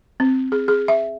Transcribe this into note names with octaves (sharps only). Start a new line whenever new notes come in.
C4
G#4
G#4
E5